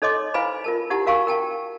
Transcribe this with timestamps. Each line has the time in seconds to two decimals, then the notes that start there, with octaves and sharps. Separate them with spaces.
0.02 D#4 A4 C#5 D#5 C6 D6
0.34 E4 B4 C5 F5 G#5 B5
0.64 F4 A#4 A5
0.90 D#4 E4 G4 F#5 A5
1.06 F#4 A#4 F5 G#5 A#5 C#6
1.27 A#4 G5 A5